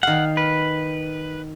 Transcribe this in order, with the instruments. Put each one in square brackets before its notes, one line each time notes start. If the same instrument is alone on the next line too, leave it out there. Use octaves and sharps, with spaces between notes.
[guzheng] D#3 F5 [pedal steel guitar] F#5
[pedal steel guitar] B4